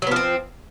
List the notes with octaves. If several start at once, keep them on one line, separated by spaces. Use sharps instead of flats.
F3 F#3 B3 C4